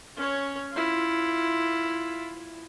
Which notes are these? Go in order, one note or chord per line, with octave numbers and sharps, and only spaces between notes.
C#4 C#5
E4 F4